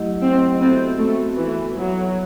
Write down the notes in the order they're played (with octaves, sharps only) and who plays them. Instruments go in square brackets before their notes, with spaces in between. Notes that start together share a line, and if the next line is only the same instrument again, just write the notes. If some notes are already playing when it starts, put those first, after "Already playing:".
Already playing: [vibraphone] F#3 A3 E4 G4 D#5
[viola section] C4
[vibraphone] B3 F#4 A4 E5 [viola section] C4
[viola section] A3
E3
F#3